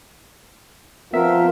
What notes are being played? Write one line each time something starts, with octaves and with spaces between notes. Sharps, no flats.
F3 B3 C4 F4 A#4 E5